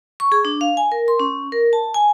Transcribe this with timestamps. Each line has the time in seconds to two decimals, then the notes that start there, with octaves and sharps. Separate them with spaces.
0.20 C#6
0.32 G#4
0.45 D4
0.61 F5
0.77 G#5
0.92 A#4
1.08 C6
1.20 C#4
1.52 A#4
1.73 A5
1.94 G#5